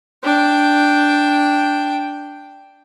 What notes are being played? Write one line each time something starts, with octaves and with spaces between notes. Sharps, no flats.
D4 G5